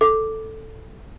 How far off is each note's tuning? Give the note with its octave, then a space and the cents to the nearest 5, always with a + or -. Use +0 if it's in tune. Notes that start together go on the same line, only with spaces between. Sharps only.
A4 +0 D6 +0